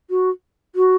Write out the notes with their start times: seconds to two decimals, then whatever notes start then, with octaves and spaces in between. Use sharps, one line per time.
0.10 F#4
0.76 F#4